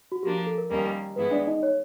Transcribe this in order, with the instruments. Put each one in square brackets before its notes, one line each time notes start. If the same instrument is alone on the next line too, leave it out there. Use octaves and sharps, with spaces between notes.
[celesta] F#4
[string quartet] F3 A#3 D4 [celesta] G4
[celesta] A4
A#4
[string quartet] D#2 D#3 G3 A#3 C#4
[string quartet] G#2 E3 G#3 B3 E4 [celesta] B4
[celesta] D4 D5
D#4 D#5
C#5